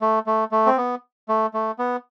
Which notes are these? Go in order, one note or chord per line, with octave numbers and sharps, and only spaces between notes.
A3
A3
A3
C4
B3
A3
A3
B3